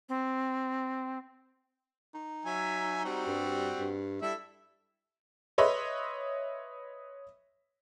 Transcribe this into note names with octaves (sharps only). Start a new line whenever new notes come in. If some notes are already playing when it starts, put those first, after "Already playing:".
C4
D#4
F#3 E5 G#5
G3 C4 F#4
G2
G2
G3 E4 A4 E5
B4 C#5 D#5 E5 B5 C6